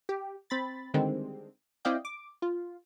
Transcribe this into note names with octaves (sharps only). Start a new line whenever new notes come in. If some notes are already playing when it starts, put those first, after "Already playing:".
G4
C4 B5 A6
D3 D#3 G3 G#3 C4
C4 E4 D5 D#5 F5 G5
D6
F4